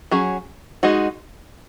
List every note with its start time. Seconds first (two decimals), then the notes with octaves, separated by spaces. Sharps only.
0.11 F#3 C#4 G#4
0.83 G#3 D#4 F#4